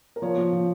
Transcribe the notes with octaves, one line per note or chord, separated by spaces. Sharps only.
A#4
F3 C#5
F3
F3